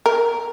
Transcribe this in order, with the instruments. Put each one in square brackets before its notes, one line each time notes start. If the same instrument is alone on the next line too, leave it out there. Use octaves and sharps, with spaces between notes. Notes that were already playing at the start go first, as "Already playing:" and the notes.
[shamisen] A#4